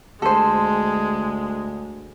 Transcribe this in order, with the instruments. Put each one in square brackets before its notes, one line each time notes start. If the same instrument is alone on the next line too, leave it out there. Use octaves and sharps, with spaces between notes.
[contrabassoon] D2 [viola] G#3 [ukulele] A4 C5